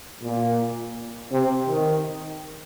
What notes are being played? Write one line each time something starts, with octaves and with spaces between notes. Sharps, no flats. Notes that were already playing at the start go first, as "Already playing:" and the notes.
A#2
C3
D#3